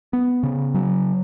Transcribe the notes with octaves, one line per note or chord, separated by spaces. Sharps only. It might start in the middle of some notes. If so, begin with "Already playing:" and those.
B3
C#3
F#3